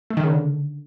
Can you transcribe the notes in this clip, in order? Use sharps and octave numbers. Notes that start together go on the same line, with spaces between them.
A3
D#3
C#3
D3